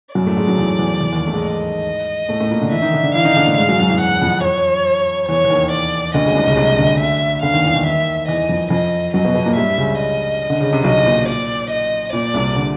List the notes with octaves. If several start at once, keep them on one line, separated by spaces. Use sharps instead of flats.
F#2 F#3 D5
A2 A3
G#2 G#3
F#2 F#3
E2 E3
E2 E3
E2 E3
D#2 D#3
A3
G#2 G#3
D#5
A2 A3
A2 A3
A#2 A#3
D3 D4
E3 E4 E5
D#3 D#4
D3 D4
D3 D4
E3 E4 F5
D#3 D#4
D3 D4
A2 A3
G#2 G#3 F5
F#2 F#3
F#2 F#3
E2 E3
F#5
F2 F3
C#5
E2 E3 C#5
E3
D#2 D#3
D5
D2 D3 D#5
C#2 C#3
C2 C3
C#2 C#3
C2 C3
D2 D3
E5
D2 D3 F5
D#2 D#3
E2 E3
D#2 D#3
D#2 D#3 E5
E2 E3 D#5
F2 F3
F2 F3 D#5
F#2 F#3 D#5
B2 B3
B2 B3
A#2 A#3
G2 G3 E5
C#2 C#3
D#5
D3
C#3
C3
B1 B2 D#5
A#2
D5
D#5
A#2 D5
C2 C3
D3